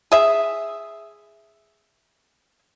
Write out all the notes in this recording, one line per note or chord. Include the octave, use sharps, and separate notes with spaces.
G#4 E5